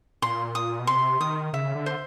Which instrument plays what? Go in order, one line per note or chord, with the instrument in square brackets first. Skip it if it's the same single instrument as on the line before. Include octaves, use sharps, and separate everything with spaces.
[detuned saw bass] A#2 [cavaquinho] C6
[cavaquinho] D#6
[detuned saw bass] B2
[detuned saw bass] C3 [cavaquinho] C6
[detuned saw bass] D#3 [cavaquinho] D#6
[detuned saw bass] C#3 [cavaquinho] E5
[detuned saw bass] D3
[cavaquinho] C5